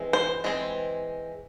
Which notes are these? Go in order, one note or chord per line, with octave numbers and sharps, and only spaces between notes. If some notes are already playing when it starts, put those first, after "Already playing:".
Already playing: E3 G#3 C4
C5
E3 G#3 C4